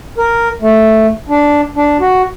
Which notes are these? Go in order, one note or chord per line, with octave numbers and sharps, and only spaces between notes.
A#4
A3
D4
D4
F#4